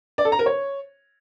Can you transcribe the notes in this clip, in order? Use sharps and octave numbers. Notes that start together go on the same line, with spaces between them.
D5
A4
A#5
A#4
C#5